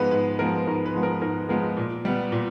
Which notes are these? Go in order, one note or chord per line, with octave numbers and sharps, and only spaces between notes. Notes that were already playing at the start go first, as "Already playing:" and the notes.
Already playing: G#2 F3 G#3 B3 B4
G#2 B4
F3 G#3 B3 A#4
G#2 A#4
B4
F3 G#3 B3
A#4
G#2 A#4
F3 G#3 B3 A#4
A#2
G3 B3
A#2